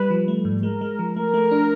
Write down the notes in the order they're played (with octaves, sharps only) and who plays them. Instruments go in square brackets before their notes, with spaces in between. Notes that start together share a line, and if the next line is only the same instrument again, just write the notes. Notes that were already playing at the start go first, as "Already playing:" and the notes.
Already playing: [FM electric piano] G3 [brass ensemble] B4
[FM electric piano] F3
A3
G#2
[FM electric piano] G#3 [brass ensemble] A#4
[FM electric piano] G#3
F3
[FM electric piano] A3 [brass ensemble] A#4
[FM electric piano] A3
D4